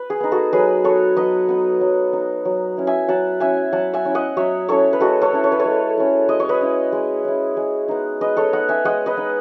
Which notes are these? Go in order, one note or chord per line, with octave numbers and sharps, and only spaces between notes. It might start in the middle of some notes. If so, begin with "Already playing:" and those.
Already playing: B4
G#4
B3 D#4
F#4 A4
F#3 G#4 B4
B3 D#4 A4 C#5
F#3 B4 D#5
B3 D#4
F#3
B3 D#4
F#3
C#4 E4
E5 G#5
F#3 F#5 A5
C#4 E4 E5 G#5
F#3 F#5 A5
E5 G#5
C#4 E4
D#5 F#5
F#3 C#5 E5
C#4 E4 A4 C#5
B4
G#3 F#4 A4
A4 C#5
C#4 E4
C#5
B4
A4 C#5
G#3
C#4 E4
G#3 D#5
C#5
B4 D#5
C#4 E4
G#3
C#4 E4
G#3
B3 D#4
G#3 B4 D#5
A4 C#5
B3 D#4 D#5 F#5
E5 G#5
G#3 D#5 F#5
B4 D#5
B3 D#4